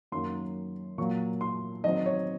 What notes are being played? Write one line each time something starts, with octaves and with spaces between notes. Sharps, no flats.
F#2 D#3 F#3 A#3 C#4 C6
A#2 F#3 A#3 C#6
C6
D#3 F#3 C4 D#5
C#5